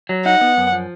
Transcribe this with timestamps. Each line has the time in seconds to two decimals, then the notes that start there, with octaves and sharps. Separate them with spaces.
0.09 F#3
0.25 D#4 F#5
0.41 B3
0.57 F#2
0.72 F3